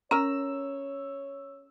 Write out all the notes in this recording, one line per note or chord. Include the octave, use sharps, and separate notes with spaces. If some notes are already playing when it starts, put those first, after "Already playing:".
C#4 A#4 C#5 A#5 E6